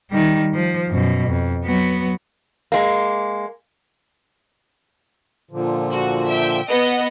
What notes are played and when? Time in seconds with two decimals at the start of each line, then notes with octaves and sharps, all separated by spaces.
0.10 D#3 G3
0.54 F3
0.89 F#2 B2
1.28 F2
1.65 F#3 B3
2.72 G#3 A#3
5.51 A#2 D3 F3
5.91 F#4
6.28 E5 G5
6.69 B3 D#5 F#5